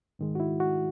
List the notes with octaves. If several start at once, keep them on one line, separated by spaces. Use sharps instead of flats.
G#2 D#3 G#3
F#4
E4
F#4